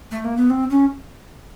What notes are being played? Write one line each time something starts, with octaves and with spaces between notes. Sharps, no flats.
A3
A#3
B3
C4
C#4